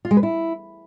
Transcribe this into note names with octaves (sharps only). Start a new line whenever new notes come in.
F4
G#3
B4
E4